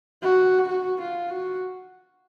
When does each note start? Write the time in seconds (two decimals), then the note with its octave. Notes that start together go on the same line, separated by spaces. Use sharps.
0.22 F#4
0.68 F#4
1.00 F4
1.30 F#4